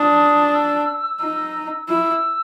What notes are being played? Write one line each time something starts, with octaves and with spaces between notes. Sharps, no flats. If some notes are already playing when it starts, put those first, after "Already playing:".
Already playing: D4 D#6
E6
D#4
E4 E6